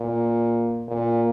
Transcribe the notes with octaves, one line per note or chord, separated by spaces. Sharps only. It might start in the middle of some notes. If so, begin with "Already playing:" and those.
Already playing: A#2
A#2